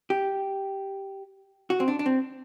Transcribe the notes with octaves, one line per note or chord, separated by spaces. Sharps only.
G4
F#4
C4
D4
D4
C4